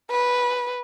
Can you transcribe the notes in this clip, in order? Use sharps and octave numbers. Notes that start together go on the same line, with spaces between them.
B4